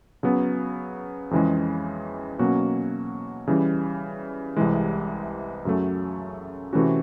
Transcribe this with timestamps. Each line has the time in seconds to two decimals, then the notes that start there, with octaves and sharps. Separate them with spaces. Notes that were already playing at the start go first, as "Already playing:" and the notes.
0.23 C#3 F#3 B3
1.31 F2 C#3 E3 G#3
2.39 B2 F#3 A#3 C#4 F#4
3.47 C#3 E3 G3
4.56 C2 C3 E3 G#3
5.65 F#2 C#3 F#3 A3
6.73 C3 E3 A3 C#4 F#4